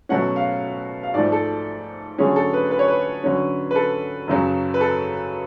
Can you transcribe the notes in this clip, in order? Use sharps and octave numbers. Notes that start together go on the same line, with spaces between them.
B2 F#3 A3 C#4 F#5
F5
F5
G#2 F3 A3 D5
A4
D3 F#3 A3 C#4 G#4
A4
B4
B4
C#5
B4
D3 F#3 C#4
B4
A4
F#2 C#3 F#3
B4
A4